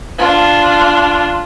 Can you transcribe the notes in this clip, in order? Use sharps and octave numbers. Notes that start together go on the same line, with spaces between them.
D4 F4